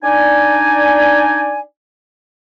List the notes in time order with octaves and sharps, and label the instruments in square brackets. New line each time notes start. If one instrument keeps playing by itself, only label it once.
[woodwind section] D4 D#4 D5 G#5